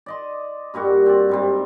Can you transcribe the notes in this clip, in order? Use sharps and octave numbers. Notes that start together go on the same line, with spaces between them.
D5 D#5 C6
G2 A#2 G3 F#4
C4 D5
G#2 G3 C4